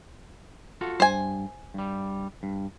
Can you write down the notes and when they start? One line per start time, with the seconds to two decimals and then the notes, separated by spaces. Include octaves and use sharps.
0.81 F4 F#4 A4
1.00 G2 C5 G#5
1.74 G2 G3
2.43 G2